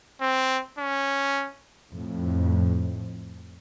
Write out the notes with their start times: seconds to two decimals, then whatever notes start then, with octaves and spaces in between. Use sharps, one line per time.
0.22 C4
0.79 C#4
1.92 F2 A2